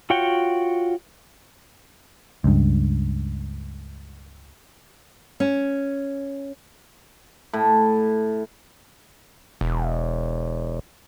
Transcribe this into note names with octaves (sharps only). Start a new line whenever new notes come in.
F4 F#4 C#5 F#5 G5
C#2 G2
C#4
A2
E1